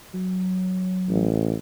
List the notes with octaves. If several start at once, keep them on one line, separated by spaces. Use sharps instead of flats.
F#3
A1